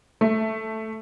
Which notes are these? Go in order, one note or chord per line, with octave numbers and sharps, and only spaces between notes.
A3